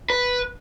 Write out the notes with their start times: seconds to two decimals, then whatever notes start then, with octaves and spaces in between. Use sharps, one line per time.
0.10 B4